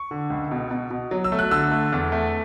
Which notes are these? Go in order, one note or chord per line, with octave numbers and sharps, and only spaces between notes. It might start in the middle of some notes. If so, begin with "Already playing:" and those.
Already playing: C#6
D3
C#2
B2
B2
B2
F#3
E6
A3
F#6
D3 E6
A3
E2
A3